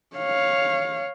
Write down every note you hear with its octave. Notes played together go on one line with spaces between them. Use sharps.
C#5 F5